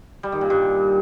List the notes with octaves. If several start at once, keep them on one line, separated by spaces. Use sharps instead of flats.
G3
D#3
A#2
G2